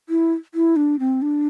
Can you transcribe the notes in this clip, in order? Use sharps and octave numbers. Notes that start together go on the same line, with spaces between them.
E4
E4
D4
C4
D4